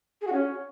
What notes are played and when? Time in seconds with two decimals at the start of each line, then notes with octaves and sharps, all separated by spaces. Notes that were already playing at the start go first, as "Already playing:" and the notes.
0.21 G#4
0.27 F#4
0.33 C#4